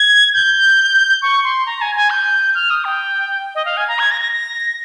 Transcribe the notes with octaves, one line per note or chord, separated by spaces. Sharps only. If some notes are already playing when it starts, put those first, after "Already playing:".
Already playing: G#6
G6
C#6
C6
A#5
G#5
G#5
G6
F6
D#6
G5
D#5
F5
G#5
A#5
G#6
A#6
A#6
A#6